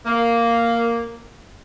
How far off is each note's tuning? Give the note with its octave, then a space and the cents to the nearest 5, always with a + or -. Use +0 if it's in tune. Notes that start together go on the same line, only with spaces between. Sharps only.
A#3 -5